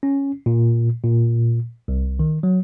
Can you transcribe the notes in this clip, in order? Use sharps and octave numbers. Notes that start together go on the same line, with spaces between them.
C#4
A#2
A#2
C2
D#3
F#3